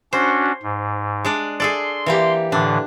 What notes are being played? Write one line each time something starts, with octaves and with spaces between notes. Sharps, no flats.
C#4 D4 F#4 C5
G#2
G#3 D4 D5
G#4 A4 D5 C6
E3 A#3 G4
A2 D3 E3 D4